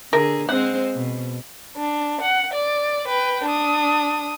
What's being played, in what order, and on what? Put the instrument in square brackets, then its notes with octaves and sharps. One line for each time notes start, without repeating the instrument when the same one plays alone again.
[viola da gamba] D3 G#4 [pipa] A#4
[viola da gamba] G#3 C4 C5 [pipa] F#5
[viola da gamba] B2
[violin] D4
F#5
D5
B4 G5
D4 D#6